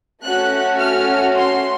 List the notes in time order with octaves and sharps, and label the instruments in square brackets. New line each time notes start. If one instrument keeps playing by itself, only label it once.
[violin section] A3 C#4 F#4 F#6
F6
C6